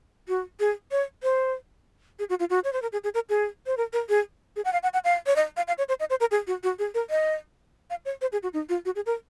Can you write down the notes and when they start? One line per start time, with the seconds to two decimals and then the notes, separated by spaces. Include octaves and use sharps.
0.28 F#4
0.60 G#4
0.91 C#5
1.23 C5
2.19 G#4
2.30 F#4
2.40 F4
2.50 F#4
2.64 C#5
2.73 C5
2.82 A#4
2.92 G#4
3.04 G#4
3.14 A#4
3.29 G#4
3.67 C5
3.77 A#4
3.93 A#4
4.09 G#4
4.56 G#4
4.65 F#5
4.73 F5
4.83 F#5
4.94 F#5
5.04 F5
5.26 C#5
5.36 D#5
5.57 F5
5.68 F5
5.78 C#5
5.89 C5
6.00 D#5
6.10 C5
6.20 A#4
6.31 G#4
6.47 F#4
6.63 F#4
6.79 G#4
6.94 A#4
7.10 D#5
7.90 F5
8.05 C#5
8.21 C5
8.32 G#4
8.43 F#4
8.54 D#4
8.69 F4
8.85 F#4
8.95 G#4
9.06 A#4